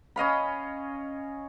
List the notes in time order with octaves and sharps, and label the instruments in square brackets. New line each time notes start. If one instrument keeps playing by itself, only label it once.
[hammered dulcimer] C#4 D#5 F5 B5